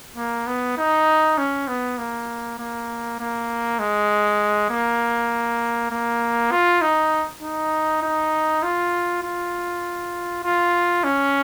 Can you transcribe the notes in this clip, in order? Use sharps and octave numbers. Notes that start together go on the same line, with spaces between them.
A#3
B3
D#4
C#4
B3
A#3
A#3
A#3
G#3
A#3
A#3
F4
D#4
D#4
D#4
F4
F4
F4
C#4